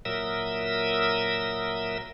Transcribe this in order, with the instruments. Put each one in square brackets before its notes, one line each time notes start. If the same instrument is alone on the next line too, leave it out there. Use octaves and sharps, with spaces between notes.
[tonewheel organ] A#2 F#3 A#4 E5 D#6 E6